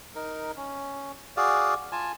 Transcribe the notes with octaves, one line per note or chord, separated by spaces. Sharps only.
D#4 A#4
C#4
F#4 G#4 D5 F5
F4 G#5 A5